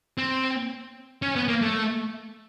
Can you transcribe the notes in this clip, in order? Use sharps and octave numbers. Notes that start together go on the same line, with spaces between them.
C4
C#4
B3
A#3
A3